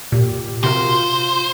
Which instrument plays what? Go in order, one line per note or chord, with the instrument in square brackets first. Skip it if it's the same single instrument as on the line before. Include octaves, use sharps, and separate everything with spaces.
[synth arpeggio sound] A#2 [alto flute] G4
[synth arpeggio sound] C3 F#4 A#4 [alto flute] F4 [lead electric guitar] C5